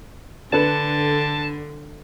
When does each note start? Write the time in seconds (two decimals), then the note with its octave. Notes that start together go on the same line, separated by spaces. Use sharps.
0.53 D3 D4 A4 B4 A5